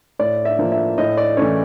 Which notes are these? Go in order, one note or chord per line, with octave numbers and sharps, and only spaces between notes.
A2 D5
E5
F3 A#3
E5
A2 D#5
D5
E3 A3 C#4 C#5